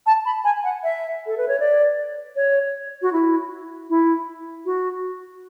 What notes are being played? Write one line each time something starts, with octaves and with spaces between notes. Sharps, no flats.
A5
B5
G#5
F#5
E5
A4
B4
C#5
D5
C#5
F#4
E4
E4
F#4